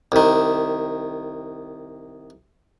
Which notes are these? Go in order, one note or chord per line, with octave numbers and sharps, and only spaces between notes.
C2 D#3